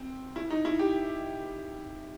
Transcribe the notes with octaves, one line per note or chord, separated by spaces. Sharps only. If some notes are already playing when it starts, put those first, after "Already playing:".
Already playing: C4
E4
D#4
E4
G4